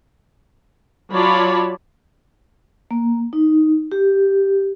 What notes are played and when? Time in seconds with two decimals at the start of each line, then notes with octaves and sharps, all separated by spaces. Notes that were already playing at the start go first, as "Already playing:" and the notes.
1.13 F#3 F4 C#5 D5 A5 B5
2.91 A#3
3.33 D#4
3.92 G4